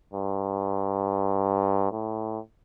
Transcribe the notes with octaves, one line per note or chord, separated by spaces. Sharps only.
G2
A2